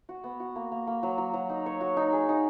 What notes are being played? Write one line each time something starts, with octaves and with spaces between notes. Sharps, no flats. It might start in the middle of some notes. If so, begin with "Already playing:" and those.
F#4
B3
F#4
A#3
A#3
A#3
F#3
F#3
F#3
D#4
C#5
F#4
D#4
G#4
D#4